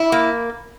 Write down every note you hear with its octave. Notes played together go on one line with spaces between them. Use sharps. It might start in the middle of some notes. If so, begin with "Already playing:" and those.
Already playing: E4
A#3